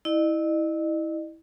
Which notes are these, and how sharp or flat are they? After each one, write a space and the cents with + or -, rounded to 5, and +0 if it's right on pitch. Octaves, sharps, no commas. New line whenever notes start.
E4 -20 D#5 -40